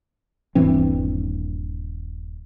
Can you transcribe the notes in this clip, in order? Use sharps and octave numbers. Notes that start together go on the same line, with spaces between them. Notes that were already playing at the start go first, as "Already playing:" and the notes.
D#1 G2 E3 C4